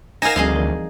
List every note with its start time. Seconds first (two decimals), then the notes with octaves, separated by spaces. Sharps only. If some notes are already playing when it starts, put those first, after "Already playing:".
0.22 D#4 A#4 F5 F#5 G#5 A#5 A#6 E7
0.36 D2 F3 G3 C4 G#4 D#5 F5
0.54 E3 A#4